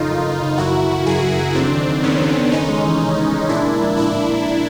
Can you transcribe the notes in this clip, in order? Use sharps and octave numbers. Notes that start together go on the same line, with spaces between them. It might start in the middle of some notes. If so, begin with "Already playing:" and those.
Already playing: F2 C#3 D#4 F4
F#1
F#1
C#3
F#2 E4 F#4
F#3
C#3
F#2 F#4 G#4
F#2
F#3
F1 C4 D4
D#3
D#2
F1 B3 C#4
F1
D#3
B3 C#4 D#4
G#3
E3
C3
B3
G#3
A#2 D4 E4
A#3
F3
A#2 D4 E4
A#2
A#3